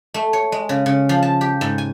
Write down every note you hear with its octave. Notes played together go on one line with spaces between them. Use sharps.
A3
C#5
G#3
C#3
C#3
F3
A5
G4
G#2
G#5